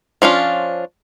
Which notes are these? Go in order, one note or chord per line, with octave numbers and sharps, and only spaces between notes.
F3 C#4 D4 F4